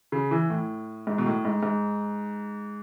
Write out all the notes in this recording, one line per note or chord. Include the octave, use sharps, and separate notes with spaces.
C#3
E3
A2
G#2
B2
A2
G#2
G#2